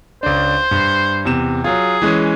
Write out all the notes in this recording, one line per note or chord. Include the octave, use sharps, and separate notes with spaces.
C#2 D4 C5
G2
E2 C3 E7
F#3 F4 G#4
E3 G#3 C#4